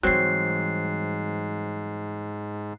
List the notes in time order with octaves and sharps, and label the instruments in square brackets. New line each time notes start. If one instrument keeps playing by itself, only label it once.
[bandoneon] G#2 [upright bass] E3 G3 [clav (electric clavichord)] F#3 C4 [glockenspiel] F#6 C7